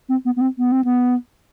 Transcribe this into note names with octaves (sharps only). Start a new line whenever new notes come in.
C4
B3
B3
C4
B3
C4
B3